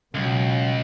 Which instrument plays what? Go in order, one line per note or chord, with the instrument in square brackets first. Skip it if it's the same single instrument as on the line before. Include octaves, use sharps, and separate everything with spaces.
[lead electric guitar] C#2 [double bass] B2 F#3